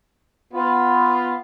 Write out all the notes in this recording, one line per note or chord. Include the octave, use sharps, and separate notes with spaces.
B3 F4